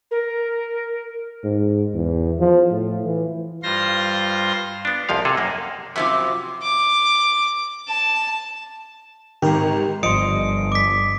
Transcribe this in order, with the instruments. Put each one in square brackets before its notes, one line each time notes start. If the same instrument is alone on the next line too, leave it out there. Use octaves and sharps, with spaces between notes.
[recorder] A#4
[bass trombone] G#2
E2
F3
A2
E3
[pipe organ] G2 F4 C5 C6 A#6
[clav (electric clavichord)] B3 D4
C2 F2 F3 F5
C3 G#4 A4
F#2 A#3
[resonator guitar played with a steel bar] F#2 C3 F3 [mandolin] B5 D6
[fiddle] D6
A5
[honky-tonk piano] G#1 D#3 [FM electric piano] G4 A#4
[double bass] G1 [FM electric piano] F3 C6 [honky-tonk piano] D#5 [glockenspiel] D#6 C#7 D7
[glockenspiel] D6 B6